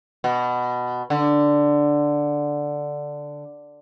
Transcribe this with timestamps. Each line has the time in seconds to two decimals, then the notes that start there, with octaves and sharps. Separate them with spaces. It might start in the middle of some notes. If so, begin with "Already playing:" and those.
0.24 B2
1.10 D3